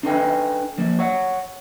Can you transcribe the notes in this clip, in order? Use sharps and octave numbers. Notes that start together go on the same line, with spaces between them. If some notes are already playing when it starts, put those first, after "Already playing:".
D4 D#4 A4 B4 G5 G#5
F3 A#3
C#5 F#5